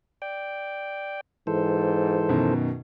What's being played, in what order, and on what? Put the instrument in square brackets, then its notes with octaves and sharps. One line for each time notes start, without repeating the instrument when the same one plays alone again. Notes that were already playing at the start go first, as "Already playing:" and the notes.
[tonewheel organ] D5 G5
[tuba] G#2 [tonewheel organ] E3 A4 C5
[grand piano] F#2 B2 D#3